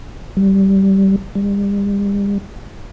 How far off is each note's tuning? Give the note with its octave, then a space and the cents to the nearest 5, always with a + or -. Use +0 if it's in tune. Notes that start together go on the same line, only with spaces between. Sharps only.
G3 -15
G3 +40